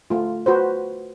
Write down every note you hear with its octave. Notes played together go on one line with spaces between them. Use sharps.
A3 F4
F#4 B4 C5